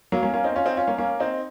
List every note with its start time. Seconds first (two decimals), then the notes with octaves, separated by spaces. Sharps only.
0.12 F#3 A#3
0.23 A#3 C#4
0.33 A#3 C#4
0.44 C4 D#4
0.56 C#4 F4
0.66 C4 D#4
0.77 C#4 F4
0.87 A#3 C#4
0.98 A#3 C#4
1.20 C4 D#4